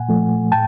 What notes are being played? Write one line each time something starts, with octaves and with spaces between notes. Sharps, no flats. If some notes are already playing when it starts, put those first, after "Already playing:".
Already playing: A#2 F#5 G#5
F3 A3
A2 G5 A5